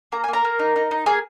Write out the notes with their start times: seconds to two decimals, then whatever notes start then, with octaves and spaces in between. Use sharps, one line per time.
0.12 A#3 A#5
0.24 G#5
0.28 A#3
0.33 A#4 A#5
0.45 A#3
0.59 D#4
0.76 D#4
0.91 D#4
1.06 A#3 G#4 G#5